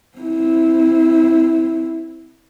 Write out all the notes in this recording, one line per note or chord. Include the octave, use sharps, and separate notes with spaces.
C4 E4